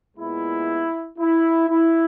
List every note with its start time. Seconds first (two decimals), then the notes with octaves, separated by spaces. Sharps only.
0.17 A#2 G#3 B3 E4
1.19 E4
1.70 E4